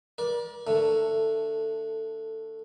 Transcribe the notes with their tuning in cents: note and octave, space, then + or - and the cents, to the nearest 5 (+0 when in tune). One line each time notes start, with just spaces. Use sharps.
A#4 +45 D5 +0
D3 +0 A3 +15